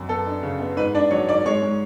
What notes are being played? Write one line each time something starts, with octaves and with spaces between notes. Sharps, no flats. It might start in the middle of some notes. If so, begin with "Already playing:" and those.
Already playing: F#2
B3 A4
D4
C#3
B3
G#2 B4
G#2 D4 D5
F#3 C#5 C#6
G#2 D5 D6
G#3 C#5 C#6
G#3